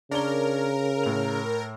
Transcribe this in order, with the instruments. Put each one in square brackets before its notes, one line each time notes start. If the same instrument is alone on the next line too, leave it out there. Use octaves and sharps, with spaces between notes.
[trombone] C#3 [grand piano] D4 C#5 G7 [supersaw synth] A#4
[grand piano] A2 F7